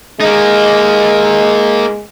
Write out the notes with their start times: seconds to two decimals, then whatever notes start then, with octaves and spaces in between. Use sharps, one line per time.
0.21 G#3 A#3 D#4